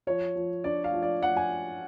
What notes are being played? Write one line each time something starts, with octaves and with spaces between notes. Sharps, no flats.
F3 C#5
F3
D4 D5
F5
F3
D5
F3 F#5
G#5